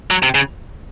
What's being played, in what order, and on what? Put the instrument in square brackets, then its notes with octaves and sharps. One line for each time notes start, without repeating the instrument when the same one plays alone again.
[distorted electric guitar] F#3
C3
C#3